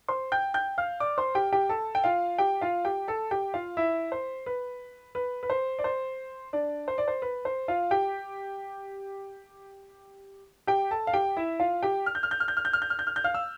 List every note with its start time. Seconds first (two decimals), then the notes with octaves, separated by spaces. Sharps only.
0.08 C5 C6
0.32 G5 G6
0.54 G5 G6
0.78 F5 F6
1.00 D5 D6
1.18 C5 C6
1.35 G4 G5
1.53 G4 G5
1.69 A4 A5
1.95 G5
2.04 F4 F5
2.38 G4 G5
2.61 F4 F5
2.85 G4 G5
3.08 A4 A5
3.31 G4 G5
3.54 F4 F5
3.77 E4 E5
4.12 C5
4.46 B4
5.15 B4
5.43 B4
5.50 C5
5.79 D5
5.84 C5
6.53 D4 D5
6.88 C5
6.98 D5
7.08 C5
7.22 B4
7.45 C5
7.68 F4 F5
7.91 G4 G5
10.67 G4 G5
10.91 A4 A5
11.07 F5
11.13 G4 G5
11.37 E4 E5
11.60 F4 F5
11.83 G4 G5
12.06 F6
12.15 G6
12.23 F6
12.31 G6
12.40 F6
12.48 G6
12.57 F6
12.65 G6
12.73 F6
12.82 G6
12.90 F6
12.99 G6
13.07 F6
13.16 G6
13.24 F5 F6
13.34 E6